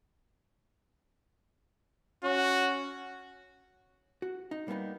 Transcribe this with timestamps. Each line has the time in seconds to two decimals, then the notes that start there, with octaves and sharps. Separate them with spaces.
2.24 C#4 F#4
4.22 F#4
4.51 D#4
4.68 G3 A#3 B3 C#4 D#4